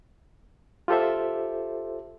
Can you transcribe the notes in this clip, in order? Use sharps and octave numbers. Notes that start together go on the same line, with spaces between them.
F4 G4 A4 C5 E5